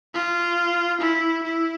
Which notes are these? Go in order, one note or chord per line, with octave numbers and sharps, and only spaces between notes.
F4
E4
E4